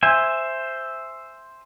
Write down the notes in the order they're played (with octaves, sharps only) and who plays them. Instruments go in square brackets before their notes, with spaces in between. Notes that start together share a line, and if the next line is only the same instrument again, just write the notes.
[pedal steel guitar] C5 E5 G#5